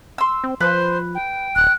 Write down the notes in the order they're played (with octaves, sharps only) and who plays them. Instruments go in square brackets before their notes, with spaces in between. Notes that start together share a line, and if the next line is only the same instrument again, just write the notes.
[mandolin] C6 E6
[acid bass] C4
[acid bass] F3 [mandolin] B4 [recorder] C5
[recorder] G5
[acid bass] D1 [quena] F#6